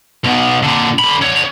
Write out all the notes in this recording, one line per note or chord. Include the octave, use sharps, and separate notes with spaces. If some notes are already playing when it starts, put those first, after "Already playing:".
B1 B2
A#2 D3
D3 B5
D3 C#5